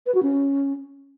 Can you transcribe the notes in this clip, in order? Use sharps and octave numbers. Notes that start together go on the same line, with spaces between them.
B4
F#4
C#4